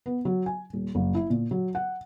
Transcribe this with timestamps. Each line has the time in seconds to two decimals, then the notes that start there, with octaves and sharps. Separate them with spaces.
0.06 B3
0.25 F#3
0.46 G#5
0.73 D#1
0.95 F#1
1.15 E4
1.30 A#2
1.51 F#3
1.75 F#5